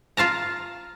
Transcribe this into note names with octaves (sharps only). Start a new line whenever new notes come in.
F4 F5 A5 A#5